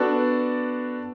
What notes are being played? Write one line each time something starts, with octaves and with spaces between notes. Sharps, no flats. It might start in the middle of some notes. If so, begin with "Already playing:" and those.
Already playing: B3 D4 F#4 A4 D5